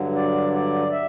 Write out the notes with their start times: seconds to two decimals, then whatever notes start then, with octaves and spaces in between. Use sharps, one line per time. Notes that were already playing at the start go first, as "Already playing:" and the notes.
Already playing: G2 D3 F#3
0.15 D5
0.53 D5
0.91 E5